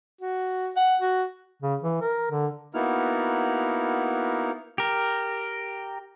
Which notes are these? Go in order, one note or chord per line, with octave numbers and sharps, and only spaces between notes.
F#4
F#5
F#4
C#3
E3
A#4
D3
A#3 B3 D#4 E4 F#4 F6
G4 A#4